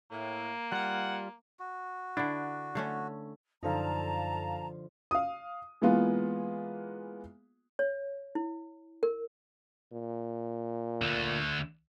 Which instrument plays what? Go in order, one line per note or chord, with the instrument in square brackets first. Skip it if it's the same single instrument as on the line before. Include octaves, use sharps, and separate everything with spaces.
[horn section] A2 [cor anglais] A#3
[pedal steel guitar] G3 F4 [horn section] F#5
[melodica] F#4
[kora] D3 E4 [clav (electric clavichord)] D4
[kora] D3 A3 C#4
[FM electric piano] F#2 A4 F5 [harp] D3 F3 D#4 [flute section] A5 A#5
[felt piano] F5 D#6
E3 G#3 A#3 B3 F4
[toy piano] C#5
E4
A#4
[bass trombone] A#2
[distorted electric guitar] D2 D3